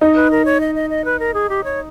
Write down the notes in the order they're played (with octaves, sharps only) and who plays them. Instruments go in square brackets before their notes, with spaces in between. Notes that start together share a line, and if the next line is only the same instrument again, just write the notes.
[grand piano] D#4 [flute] D#5
[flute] B4
A#4
C#5
D#5
D#5
D#5
B4
A#4
G#4
G4
C#5